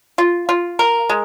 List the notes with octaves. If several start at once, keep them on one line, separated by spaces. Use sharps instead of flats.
F4
F4
A#4
G#3